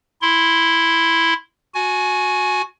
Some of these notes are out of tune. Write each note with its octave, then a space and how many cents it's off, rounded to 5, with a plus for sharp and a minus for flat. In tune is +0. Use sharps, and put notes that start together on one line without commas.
E4 +0 C6 +0
F#4 -15 G#5 +20